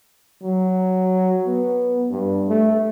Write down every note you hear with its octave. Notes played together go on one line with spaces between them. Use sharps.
F#3
B3
G2
A3